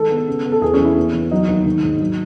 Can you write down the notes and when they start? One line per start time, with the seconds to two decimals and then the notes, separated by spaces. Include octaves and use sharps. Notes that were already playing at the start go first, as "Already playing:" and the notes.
Already playing: D#3 G#3 A4
0.10 B3
0.28 C#3
0.45 B3
0.52 A4
0.62 E2 G#4
0.74 C#4
0.79 E3
0.85 E4
0.97 B3
1.14 E3
1.31 F#3 D#4
1.48 D#2
1.66 D#3
1.83 G#2
2.00 F#3